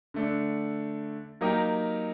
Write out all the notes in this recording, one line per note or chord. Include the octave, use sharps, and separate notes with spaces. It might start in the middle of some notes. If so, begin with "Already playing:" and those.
D3 A3 D4
F#3 A#3 D#4 G4 A#4